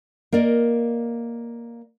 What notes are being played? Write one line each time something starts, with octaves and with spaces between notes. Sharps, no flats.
A#3 A#4 D5 D#5